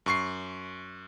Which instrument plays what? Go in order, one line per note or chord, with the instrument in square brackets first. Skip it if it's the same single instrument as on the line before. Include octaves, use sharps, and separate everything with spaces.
[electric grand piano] F#2 C#6 C7